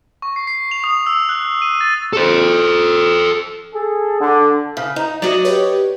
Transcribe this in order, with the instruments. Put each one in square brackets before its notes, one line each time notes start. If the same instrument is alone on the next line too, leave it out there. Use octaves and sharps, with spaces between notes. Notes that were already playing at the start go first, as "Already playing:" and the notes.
[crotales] C#6
C7
C7
F7
D#6
E6
F#6
D#7
A6
[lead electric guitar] A4 C5
[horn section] G#4 A4
D3
[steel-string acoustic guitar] C#3
D#4
[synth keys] F#3 F#4 [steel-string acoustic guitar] D5 D#5
[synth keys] G4 B4 C#5